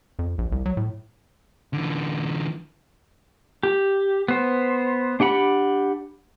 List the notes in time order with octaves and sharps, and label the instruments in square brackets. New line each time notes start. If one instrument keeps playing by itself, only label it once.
[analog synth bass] F2
A#1
C2
F#3
A2
[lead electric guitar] D3 E3
[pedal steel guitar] G4
B3 C5
D4 G4 F#5 B5